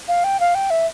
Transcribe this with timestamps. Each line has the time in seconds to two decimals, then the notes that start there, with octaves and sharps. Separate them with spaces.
0.08 F5
0.24 G5
0.40 F5
0.55 G5
0.70 E5